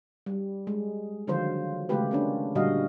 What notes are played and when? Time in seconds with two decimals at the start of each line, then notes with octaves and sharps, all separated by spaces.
0.26 G3
0.67 G#3
1.27 D3 D#3 F3 F#3 F4 C5
1.89 C#3 G#3 A3 F4 G4 B4
2.11 A#3 C#4 D4
2.55 A#2 D3 G3 F#4 D#5 F5